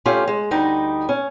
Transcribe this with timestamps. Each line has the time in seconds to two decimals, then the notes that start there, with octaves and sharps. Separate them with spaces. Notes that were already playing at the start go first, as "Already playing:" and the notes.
0.05 A3 C#4 F4 G4
0.27 G#3
0.51 D2 G3 D#4 D#5
1.09 C#4